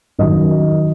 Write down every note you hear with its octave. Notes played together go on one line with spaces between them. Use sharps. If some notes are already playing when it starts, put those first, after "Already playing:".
F#2 D#3 F#3 D#5